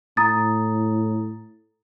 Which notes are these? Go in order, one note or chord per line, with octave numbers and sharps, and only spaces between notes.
A2 A#5 D#6 A6